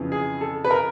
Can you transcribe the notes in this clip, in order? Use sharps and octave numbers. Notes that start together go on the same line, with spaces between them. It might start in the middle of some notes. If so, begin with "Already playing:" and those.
Already playing: F2 C#3 E3
G#4
A4
B4
A#4